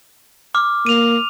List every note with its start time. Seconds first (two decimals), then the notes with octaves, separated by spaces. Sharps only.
0.55 D6 F6
0.86 A#3 D#7 F7